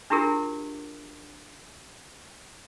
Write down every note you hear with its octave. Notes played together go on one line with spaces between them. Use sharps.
D4 E4 F4 G4 G#4 A#4